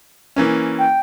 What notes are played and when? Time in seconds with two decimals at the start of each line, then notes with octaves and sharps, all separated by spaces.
0.36 E3 A#3 C#4
0.79 G5